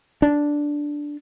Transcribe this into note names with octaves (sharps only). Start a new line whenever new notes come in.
D4